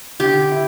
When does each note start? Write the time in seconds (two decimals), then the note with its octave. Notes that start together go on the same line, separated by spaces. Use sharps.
0.20 D3 G4
0.52 E4